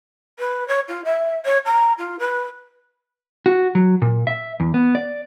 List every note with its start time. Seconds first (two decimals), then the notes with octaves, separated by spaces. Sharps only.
0.39 B4
0.68 C#5
0.88 F4
1.04 E5
1.45 C#5
1.65 A#5
1.98 F4
2.19 B4
3.46 F#4
3.75 F#3
4.02 A#2
4.27 E5
4.60 E2
4.74 B3
4.95 D5